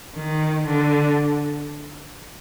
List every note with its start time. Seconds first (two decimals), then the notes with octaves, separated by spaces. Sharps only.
0.16 D#3
0.66 D3